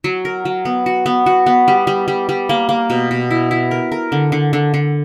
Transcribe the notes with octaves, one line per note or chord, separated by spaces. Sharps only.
F#3
A#4
F#3
B3
F#4
B3
F#4
B3
G3
G3
G3
G3
A#3
A#3
B2
B2
E4
E4
A#4
A#4
D3
D3
D3
D3